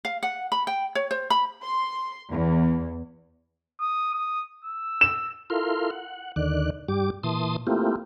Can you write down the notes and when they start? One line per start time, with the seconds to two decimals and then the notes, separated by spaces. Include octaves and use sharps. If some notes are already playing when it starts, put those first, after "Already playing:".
0.05 F5
0.23 F#5
0.52 B5
0.67 G5
0.95 C#5
1.11 C5
1.30 B5
1.64 C6
2.32 E2
3.81 D#6
4.14 D#6
4.64 E6
5.01 E7
5.50 E4 F4 A4 A#4 F5 C6
5.91 F#5
6.36 D#2 D3 D#3 D5 F#6
6.88 G2 G3 G4 D6
7.23 A#2 E3 A5 C6 D#6
7.67 A3 A#3 C4 E4 F4 G4